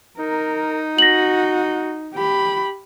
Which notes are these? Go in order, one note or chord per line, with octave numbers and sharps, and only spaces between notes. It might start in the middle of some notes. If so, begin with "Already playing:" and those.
D#4 A#4
F#4 A#6 F#7
G4 B5